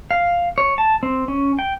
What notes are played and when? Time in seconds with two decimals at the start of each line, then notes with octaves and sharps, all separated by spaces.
0.11 F5
0.58 C#5
0.78 A5
1.03 C4
1.28 C#4
1.59 G5